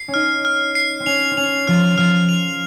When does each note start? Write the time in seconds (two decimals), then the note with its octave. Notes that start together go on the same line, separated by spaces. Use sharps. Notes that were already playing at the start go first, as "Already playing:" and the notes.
Already playing: C7
0.08 C#4
0.14 D#4 F6
0.45 F6
0.75 C7
1.00 C4
1.06 C#4 F7
1.31 C4
1.37 C#4 F7
1.67 F3 F6
1.98 F3 F6
2.29 F7